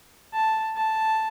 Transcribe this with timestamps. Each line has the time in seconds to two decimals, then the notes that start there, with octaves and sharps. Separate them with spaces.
0.33 A5
0.76 A5